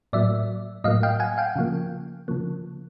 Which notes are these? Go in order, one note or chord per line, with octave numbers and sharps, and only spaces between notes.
A2 F#3 A#3 D5 E5
A2 F#3 A#3 D#5 F5
F5 G5
F#5 G#5
F5 G5
C#3 F3 A#3
C#3 F3 A#3